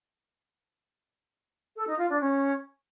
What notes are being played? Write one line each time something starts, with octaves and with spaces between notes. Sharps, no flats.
A4
D#4
F4
D4
C#4